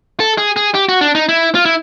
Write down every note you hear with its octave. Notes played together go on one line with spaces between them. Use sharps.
A4
G#4
G#4
G4
F#4
D4
D#4
E4
F4
E4